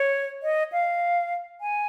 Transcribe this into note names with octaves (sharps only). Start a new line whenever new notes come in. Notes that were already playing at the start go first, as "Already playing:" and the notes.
Already playing: C#5
D#5
F5
G#5